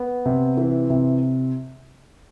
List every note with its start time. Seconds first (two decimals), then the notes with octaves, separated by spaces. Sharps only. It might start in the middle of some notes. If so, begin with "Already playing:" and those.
Already playing: B3
0.26 C3
0.57 E3
0.90 C3